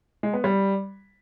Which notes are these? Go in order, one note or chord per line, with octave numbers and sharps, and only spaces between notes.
G#3
B3
G3